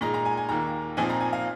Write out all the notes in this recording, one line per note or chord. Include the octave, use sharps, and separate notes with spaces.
A#2 G#3 D#4 A#5
A#5
G#5
G#5
D#2 D#3 A#3 A#5
A#2 F3 C4 D#4 G#5
A#5
G#5
F5